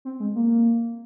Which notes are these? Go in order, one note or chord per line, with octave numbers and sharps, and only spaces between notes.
C4
G#3
A#3